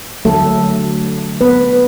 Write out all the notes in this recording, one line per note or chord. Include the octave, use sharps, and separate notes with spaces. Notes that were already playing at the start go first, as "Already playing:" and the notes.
D3 F#3 A3 A4
B3 B4